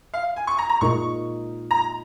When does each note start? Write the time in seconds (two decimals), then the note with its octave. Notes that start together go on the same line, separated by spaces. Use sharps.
0.14 F5
0.36 G#5
0.47 C#6
0.59 A#5
0.69 A#5
0.81 A#2 G#3 D#4 A#4 D#5 C#6
1.71 A#5